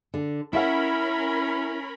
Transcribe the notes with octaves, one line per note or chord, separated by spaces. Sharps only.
D3
C#4 E4 A#4 E5 F#5 B5